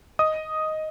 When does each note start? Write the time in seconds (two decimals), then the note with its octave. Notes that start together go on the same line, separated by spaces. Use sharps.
0.19 D#5 D#6